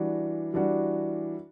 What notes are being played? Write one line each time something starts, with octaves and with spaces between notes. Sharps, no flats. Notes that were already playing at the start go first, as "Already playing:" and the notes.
Already playing: E3 G3 D4 F#4
E3 G3 D4 F#4